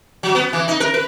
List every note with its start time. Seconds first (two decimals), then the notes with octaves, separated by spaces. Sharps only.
0.23 F#3
0.35 B3
0.53 E3
0.68 D#4
0.80 A#4
0.94 B4